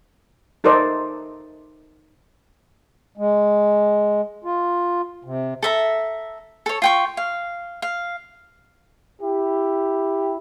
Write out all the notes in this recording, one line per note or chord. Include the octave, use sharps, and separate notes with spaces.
D#4 A4 A#4 C5 D5 D#5
G#3
F4
C3
A4 E5 A#5
A4 C#5
F4 G5 C#6
F5
F5
E4 G4